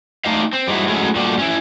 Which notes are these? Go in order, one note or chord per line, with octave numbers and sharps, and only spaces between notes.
A3 D4 D#4 G4 D#5 F5
C4
G3 G#3 C4 D#4 E4 F#4
F#3 G#3 A3 C#4 E4
A#2 D3 G3 A3 F#4 G4
C#4 E4